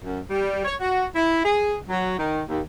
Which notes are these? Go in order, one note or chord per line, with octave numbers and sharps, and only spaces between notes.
F#2
G3
C#5
F#4
E4
G#4
F#3
D#3
D#2